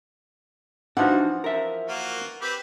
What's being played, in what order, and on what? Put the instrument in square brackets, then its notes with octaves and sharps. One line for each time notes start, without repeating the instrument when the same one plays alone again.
[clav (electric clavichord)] E3 F3 [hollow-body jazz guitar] D4 D#4 F#4 [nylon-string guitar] F#5
[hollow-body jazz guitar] A#4 E5
[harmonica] A#3 F4 F#4
C4 G4 B4